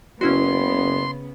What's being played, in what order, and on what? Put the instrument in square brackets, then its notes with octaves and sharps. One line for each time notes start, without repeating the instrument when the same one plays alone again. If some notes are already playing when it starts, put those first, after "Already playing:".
[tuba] F#1 [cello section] C#3 B3 [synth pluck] C#4 E4 F#4 [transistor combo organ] C6